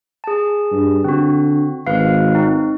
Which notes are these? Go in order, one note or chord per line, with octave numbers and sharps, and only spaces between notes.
G#4 A5
G2
D3 C4 F#4
G#1 B4 F5
C4 D#4